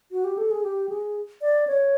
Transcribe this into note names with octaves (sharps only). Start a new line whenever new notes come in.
F#4
G4
A4
G#4
G4
G#4
D5
C#5